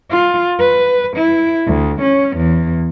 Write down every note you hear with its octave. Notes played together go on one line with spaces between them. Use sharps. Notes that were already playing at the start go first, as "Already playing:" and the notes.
F4
B4
E4
D2
C#4
E2